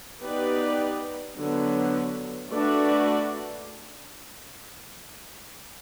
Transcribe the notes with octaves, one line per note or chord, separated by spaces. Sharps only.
B3 D#4 G4 B4 D5
D3 F#3 B3
A3 D4 F#4 B4 D5